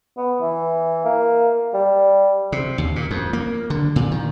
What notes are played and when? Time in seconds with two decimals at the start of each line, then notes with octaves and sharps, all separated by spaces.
0.17 B3
0.41 E3
1.05 A#3
1.74 G3
2.52 C3
2.78 D#2
2.96 A#2
3.11 F2
3.33 A#3
3.70 D3
3.96 A#2
4.12 D#3